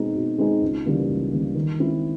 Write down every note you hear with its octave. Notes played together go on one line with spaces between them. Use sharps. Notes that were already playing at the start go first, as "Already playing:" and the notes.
Already playing: B2 G#3 C4 D#4 G#4
B2
G#3 C4 D#4 G#4
C#2
C#3 E3 G3 A#3
C#2
C#3 E3 G3 A#3
D#3
G#3 C4 E4